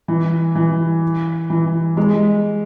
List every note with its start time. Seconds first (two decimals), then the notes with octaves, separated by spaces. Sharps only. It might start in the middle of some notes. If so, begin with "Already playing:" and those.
0.08 E3
0.55 E3
1.50 E3
1.97 G#3